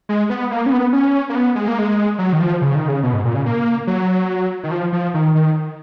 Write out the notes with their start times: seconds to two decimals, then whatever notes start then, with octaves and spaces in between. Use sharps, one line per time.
0.09 G#3
0.30 B3
0.51 A#3
0.66 C#4
0.72 B3
0.93 C#4
1.30 A#3
1.35 B3
1.55 G#3
1.68 A#3
1.79 G#3
2.19 F#3
2.33 D#3
2.40 F3
2.62 C#3
2.75 D#3
2.89 C#3
3.03 B2
3.14 G#2
3.25 A#2
3.35 C#3
3.46 A#3
3.87 F#3
4.63 D#3
4.71 F3
4.92 F3
5.14 D#3
5.35 D#3